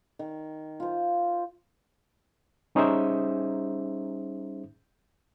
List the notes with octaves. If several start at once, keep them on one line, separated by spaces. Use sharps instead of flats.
D#3
F4 C5
G3 C#4 D#4 G#4 C5 E5